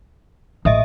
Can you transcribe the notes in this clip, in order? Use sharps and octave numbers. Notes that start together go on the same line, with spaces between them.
A1 D#5 E5 D#6